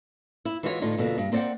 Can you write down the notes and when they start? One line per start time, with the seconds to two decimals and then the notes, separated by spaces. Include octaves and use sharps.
0.45 E4
0.63 E3 G#3 F4 F#4 G#4 C#5
0.81 A2 D3 D#4 F4
0.97 F2 B2 D3 A#3
1.18 G2
1.32 A#3 C4 D5 D#5 F#5 G5